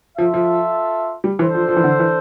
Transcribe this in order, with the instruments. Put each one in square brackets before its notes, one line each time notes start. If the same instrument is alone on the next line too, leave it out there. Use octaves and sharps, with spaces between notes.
[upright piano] F3 [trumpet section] F4 A4 E5
[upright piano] F3
G3
[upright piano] E3 [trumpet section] D4 A4 C5
[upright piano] F3
F3
E3
D3
E3